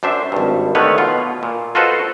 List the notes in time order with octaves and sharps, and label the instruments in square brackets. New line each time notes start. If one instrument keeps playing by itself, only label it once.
[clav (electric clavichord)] F#2 D4 C5 E5
G#1 G2
D3 D#3 A3 B4 C#5
B2 F4
A#2
F4 F#4 A4 B4 C5 D#5